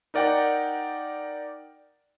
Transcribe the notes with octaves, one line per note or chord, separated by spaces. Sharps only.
D#4 A#4 D5 F#5 G5